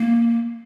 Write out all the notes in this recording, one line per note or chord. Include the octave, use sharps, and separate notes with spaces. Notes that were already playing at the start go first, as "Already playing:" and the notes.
Already playing: A#3